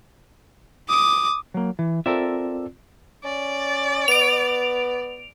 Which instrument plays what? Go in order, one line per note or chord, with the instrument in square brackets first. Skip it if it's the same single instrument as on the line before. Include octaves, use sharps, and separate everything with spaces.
[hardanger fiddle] D6 [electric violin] D#6
[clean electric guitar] F#3 A#3
E3
[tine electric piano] C4 F4 D5 [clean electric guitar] A4 A#4 E5
[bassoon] C#4 [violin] D5
[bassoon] B3 [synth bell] D7 F7